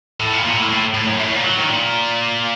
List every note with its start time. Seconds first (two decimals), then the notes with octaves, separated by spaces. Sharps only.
0.20 A2
0.33 A#2
0.45 A#2
0.58 A2
0.70 A2
0.95 A2
1.07 F#2
1.19 A2
1.32 A#2
1.44 F#3
1.57 D#3
1.69 A#2